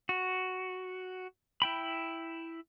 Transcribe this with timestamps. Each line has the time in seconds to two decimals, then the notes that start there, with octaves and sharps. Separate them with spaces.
0.09 F#4
1.62 E4 G5 B5